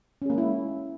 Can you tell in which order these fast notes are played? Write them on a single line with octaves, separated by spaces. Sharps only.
C#4 G#4 A#3 G#3 E4